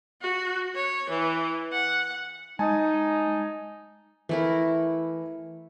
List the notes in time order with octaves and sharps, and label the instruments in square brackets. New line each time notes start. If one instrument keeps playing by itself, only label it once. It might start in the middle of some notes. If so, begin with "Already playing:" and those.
[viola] F#4
C#5
E3
F#5
[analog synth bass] G#3 [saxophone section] D#4 [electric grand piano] G#5 A5
[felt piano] E3 [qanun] A3 E4 A#4